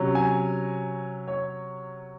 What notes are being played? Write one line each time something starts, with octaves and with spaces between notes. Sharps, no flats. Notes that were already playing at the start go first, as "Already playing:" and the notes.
Already playing: C3 F#3 C#4
G#5
C#5